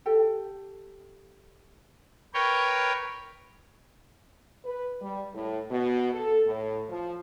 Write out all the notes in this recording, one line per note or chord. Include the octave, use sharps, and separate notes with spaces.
G4 A4 G5
A#4 B4 C#5 G5
B4
G3
A2
B2
A4
A2
F3